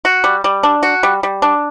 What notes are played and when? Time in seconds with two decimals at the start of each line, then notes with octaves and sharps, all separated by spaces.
0.05 F#4
0.24 G3
0.44 G3
0.63 D4
0.83 F#4
1.03 G3
1.23 G3
1.42 D4